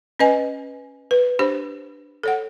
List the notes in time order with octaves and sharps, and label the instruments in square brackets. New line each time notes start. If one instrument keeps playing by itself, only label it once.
[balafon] C#4 B4 D#5 G#5
B4
D4 G4 C5
A4 C#5 F#5